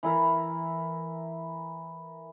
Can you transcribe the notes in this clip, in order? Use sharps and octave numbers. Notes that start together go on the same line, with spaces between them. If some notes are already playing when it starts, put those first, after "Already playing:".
E3 E4 A#4